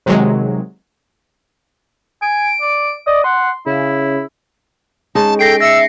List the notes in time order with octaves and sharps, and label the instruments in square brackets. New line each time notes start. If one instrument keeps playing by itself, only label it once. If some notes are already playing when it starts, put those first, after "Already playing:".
[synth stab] C3 D#3 F#3 G#3
[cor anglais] G#5 [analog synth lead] D7
[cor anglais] D5
[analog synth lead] D5 [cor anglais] D#5
[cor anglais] F#5 [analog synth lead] C6
[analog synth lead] C#3 [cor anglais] E4
[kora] G#3 C#4 D#4 [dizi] A5
[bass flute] A4 [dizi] G5 [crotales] A#6 C7 D7
[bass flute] E5 [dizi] E6 [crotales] A#6 C#7